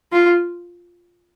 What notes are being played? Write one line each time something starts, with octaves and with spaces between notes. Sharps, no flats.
F4